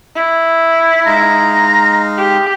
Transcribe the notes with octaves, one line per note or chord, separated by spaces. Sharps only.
E4
G#3 D#4 F5 A#5
G4